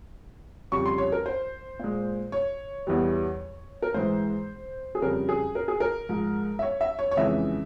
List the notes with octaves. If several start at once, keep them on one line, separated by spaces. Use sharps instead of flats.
F2 C#3 G3 C#6
C6
C#5
A#4
C5
A#2 G#3
C#5
E2 E3 G3
A#4
G#2 E3 G#3 C5
G#4
F2 C#3 G3 A#4
G#4
A#4
G#4
A#4
G#2 F3 G#3
E5
C#5
E5
C#5
C#5
F2 C#3 E3 G#3 E5